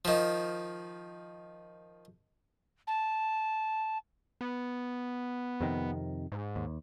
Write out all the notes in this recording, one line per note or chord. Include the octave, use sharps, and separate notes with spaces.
D#3 F3
A5
B3
F2 C3 D#3
G#2
D#2